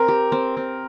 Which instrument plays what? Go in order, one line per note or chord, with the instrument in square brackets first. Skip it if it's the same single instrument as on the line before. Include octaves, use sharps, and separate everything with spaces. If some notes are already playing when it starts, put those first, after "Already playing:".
Already playing: [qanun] C4 [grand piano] A#4
[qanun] G4
C4
C4